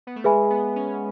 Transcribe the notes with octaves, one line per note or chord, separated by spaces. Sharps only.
B3
A3
G#3 G#4 B4 E5 G#5 B5
B3
C#4